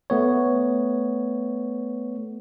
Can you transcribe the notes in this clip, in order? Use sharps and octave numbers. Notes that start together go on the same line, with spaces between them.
A3 B3 C#5